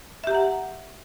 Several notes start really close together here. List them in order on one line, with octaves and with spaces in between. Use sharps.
E5 G4 A#5 F#5